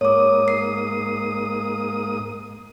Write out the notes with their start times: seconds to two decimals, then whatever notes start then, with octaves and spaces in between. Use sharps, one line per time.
0.01 G#2 A#3 C#5 D6 D#6
0.48 C7